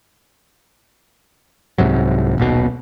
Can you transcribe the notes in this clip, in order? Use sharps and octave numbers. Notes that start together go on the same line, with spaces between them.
C2 G#2 C3 F#3
D#1 B1 B2